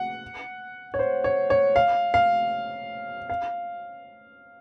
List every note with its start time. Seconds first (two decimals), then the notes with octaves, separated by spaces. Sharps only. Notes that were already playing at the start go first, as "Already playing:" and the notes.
Already playing: F#5
0.94 C#5
0.99 C5
1.24 C#5
1.50 C#5
1.76 F5
2.14 F5
3.29 F5